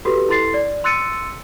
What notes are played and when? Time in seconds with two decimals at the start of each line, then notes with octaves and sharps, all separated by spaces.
0.05 F#4 G4 A4 B4
0.29 E4 A4 C6 A6 C7
0.54 D5
0.84 C6 E6 F#6 A6 C#7 D#7